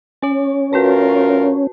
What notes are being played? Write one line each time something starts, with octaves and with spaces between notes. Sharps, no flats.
C#4 C#5 G#5
D2 F4 F#4 A#4 B4 A5